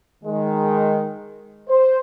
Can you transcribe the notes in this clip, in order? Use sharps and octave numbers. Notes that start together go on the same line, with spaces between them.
D#3 G#3
C5